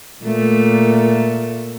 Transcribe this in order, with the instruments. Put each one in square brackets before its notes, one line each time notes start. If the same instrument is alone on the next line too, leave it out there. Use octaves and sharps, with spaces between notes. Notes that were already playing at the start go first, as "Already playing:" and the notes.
[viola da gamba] A#2 A3